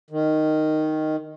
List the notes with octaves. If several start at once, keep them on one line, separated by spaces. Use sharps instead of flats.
D#3